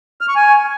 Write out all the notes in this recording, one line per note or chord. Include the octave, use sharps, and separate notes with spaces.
F6
C#6
G#5